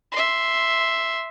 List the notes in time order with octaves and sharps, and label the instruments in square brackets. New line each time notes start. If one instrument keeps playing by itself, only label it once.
[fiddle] E5 C6